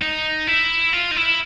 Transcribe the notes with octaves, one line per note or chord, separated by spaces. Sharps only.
D#4
E4
F4
D#4
E4